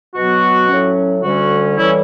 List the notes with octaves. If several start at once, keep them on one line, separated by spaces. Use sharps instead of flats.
B2 F#3 B3 F#4
A2 F#3 C#4
D2 D3 G3 C#4 F#4
A2 E3 G3 C#4 E4